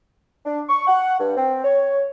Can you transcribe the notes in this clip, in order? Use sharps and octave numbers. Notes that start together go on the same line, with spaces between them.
D4
C#6
F#5
G2
C4
C#5